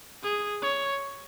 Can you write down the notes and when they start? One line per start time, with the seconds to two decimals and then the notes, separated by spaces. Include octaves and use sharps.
0.23 G#4
0.62 C#5